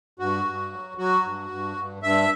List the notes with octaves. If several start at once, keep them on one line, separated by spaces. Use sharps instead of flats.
G2 F#4
G2
F#3
F#3 F#4
G2
G2
G2
G2 E5